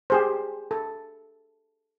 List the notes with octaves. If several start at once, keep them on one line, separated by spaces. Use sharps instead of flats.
G4 G#4 C5
A4